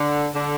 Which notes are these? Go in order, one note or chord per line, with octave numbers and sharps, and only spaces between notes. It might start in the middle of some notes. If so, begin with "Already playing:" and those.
Already playing: D3
D3